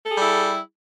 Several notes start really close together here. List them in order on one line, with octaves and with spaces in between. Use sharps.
A4 G#4 G3 E4